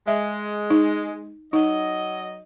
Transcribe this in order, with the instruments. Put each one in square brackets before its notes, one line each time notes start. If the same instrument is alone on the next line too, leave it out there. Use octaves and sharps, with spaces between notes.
[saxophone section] G#3 [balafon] E5
[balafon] D#4
[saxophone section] F#3 D#5 [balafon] D#4